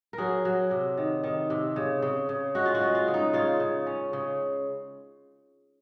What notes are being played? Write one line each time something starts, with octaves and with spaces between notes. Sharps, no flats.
A#4
F#3 G#4
F#3
C3
D#3
D#3
C3
C#3
C#3
C#3
G#3 F#4
F4
F#4
G#3
F4
C#3
D#4
C#3 F4
C#3
C#4
C#3